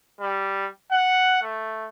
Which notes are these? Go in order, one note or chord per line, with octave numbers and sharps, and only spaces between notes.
G3
F#5
A3